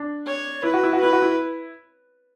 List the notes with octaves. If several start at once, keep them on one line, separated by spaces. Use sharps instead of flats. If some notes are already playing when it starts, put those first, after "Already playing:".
Already playing: D4
C#5
E4 B4
F#4
E4
F#4
E4 B4
F#4
E4